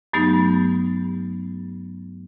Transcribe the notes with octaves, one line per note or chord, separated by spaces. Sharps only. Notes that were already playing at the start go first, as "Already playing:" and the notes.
G2 F#3 A3 B3 D#4 G4